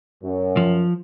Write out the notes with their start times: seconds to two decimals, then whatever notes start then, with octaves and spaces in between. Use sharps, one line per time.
0.21 F#2
0.57 F3